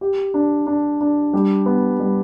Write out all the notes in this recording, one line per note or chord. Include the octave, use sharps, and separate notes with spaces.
G4
D4
D4
D4
G3
B3
G3